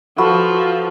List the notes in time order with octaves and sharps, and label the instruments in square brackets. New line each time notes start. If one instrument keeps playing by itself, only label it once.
[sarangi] F3 [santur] F#4 A4 B4